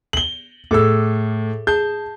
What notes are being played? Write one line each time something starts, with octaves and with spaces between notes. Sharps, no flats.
F#7 G7
A2 G#4 A4 D6 E6
G#4 A5 G6